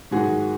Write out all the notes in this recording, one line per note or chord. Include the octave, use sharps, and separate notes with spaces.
G#2 D#3 F#3 F#4 G#4